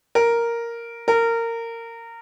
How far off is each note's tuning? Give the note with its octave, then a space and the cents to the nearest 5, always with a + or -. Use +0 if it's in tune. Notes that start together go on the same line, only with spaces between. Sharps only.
A#4 +0
A#4 -20